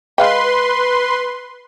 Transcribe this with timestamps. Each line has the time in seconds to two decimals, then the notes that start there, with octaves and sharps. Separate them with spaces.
0.18 G#3 B4 F5 G5 C6